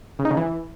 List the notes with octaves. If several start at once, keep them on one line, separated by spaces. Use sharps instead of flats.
C#3
D#4
C#3
E3